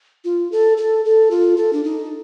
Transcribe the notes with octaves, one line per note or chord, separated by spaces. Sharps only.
F4
A4
A4
A4
F4
A4
D4
D#4